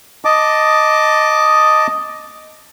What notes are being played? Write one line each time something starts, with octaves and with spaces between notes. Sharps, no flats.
D#5 A5 D6